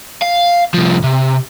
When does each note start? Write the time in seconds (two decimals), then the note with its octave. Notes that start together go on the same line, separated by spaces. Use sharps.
0.22 F5
0.74 C2 F3
1.04 C3